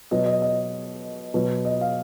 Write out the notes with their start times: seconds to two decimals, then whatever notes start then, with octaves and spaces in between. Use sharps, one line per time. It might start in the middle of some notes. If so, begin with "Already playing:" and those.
0.11 B2 F#3 D#5
0.26 D#5
0.42 D#5
1.34 B2 F#3
1.65 D#5
1.81 F5